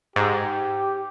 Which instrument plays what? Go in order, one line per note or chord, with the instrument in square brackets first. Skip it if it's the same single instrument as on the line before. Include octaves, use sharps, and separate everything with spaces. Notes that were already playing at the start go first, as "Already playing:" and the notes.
[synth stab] G#2 [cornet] G4